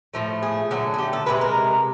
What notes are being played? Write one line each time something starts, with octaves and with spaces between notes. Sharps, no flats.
A2 F3 A3
G#4
D3 F#3 A3
G#4
G4
A4
C3 D#3 G#3 B4
A#4